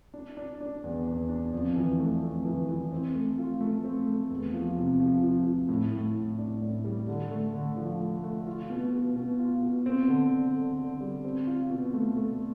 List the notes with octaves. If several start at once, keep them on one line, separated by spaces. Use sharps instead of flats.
D4
D4
D4
E2
E2
D4
F2
E3
A3
F2
E3
E3
C4
A3
F4
A3
C4
A3
E2
F3
C3
F3
F3
F3
A2
A2
A2
D4
A2
G3
D3
A3
D3
F3
A3
A3
F4
B2
B2
B2
F4
B2
C4
D3
D3
D3
D3
G3
C4
F4
B2
A3
A3